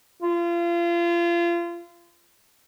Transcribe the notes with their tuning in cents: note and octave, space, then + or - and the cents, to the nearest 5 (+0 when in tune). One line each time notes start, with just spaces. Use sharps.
F4 -30